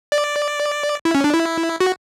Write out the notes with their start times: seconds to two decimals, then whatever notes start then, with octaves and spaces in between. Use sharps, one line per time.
0.12 D5
1.05 E4
1.15 C#4
1.24 D4
1.34 E4
1.80 F#4